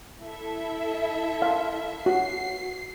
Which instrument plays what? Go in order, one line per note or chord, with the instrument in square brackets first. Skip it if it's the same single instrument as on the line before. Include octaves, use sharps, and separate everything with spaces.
[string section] E4 A4 E5
[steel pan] F5
[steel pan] F#4 [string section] C7